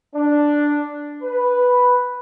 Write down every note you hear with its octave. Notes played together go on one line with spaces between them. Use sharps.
D4
B4